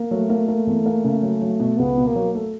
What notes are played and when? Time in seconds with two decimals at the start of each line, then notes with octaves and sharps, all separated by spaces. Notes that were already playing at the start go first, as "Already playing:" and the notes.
Already playing: A#3
0.11 F#3 A3
0.29 A#3
0.48 A#3
0.67 E2
0.86 A#3
1.04 C#3
1.22 F#3
1.41 F#3
1.60 B2
1.79 C#2 B3
1.97 B2
2.07 A#3
2.16 F#3
2.35 A3